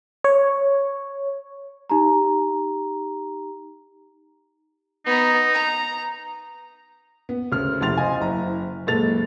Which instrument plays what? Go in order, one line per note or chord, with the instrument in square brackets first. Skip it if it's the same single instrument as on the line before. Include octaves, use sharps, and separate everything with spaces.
[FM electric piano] C#5
[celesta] D#4 G4 A#5
[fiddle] B3 A#5 [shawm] D#4
[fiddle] A#5
[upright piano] B3
D2 C#3 A#4 F6
F1 E4 G4 C6 A6 F7
C5 D#5 F5 G#5
F#1 E4 A#5
F#1 A#2 G#3 A4 A6 F7